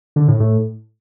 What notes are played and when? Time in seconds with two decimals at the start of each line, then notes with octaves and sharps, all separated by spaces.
0.16 D3
0.28 A2
0.40 A2